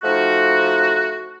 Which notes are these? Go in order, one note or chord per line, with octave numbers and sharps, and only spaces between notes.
F3 A3 D#4 F#4